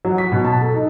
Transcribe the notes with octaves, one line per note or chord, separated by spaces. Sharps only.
F#3
B6
B2
A5
A4
D#4